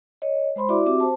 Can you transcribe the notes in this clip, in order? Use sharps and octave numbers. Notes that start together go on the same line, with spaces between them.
C#5 D#5
G#3 C5 B5 C6
E4 F#4 D5 E5 D6
C4 F#4 G4 E5 D6
C5 A5